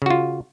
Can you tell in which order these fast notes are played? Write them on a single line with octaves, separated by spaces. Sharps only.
C#3 F#4 F4